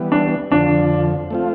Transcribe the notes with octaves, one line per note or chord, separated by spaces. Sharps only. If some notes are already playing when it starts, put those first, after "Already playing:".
Already playing: E3 G3 B3
D4
F2 D3 F3 D4
A3 C4 F4